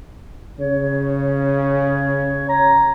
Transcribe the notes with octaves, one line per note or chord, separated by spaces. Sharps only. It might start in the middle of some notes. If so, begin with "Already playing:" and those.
C#3 C#5
A#5